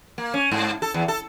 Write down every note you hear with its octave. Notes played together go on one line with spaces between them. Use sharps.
A#3
C#4
G#2
A4
E2
A4